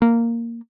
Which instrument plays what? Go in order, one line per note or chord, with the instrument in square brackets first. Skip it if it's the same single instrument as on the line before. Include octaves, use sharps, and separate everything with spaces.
[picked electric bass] A#3